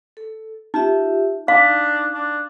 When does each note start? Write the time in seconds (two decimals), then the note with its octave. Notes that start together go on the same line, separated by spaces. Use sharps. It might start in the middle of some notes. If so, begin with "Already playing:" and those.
0.17 A4
0.74 D#4 F4 G4 E5
1.48 D4 D#4 F5
2.14 D4